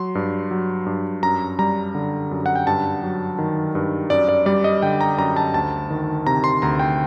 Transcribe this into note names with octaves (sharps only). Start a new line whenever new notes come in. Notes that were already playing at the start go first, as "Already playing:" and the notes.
Already playing: F#3 C6
G2
F#3
G2
F#2 A#5
G3 A#5
D3
F#2
F#5
G5
G2 A5
F#3
D#3
G2
F#2 D5
D5
G3 D5
D#5
D3 G5
A#5
F#2 A#5
A5
D2 A5
D#3
C3 A#5
C6
D2 A#5
G5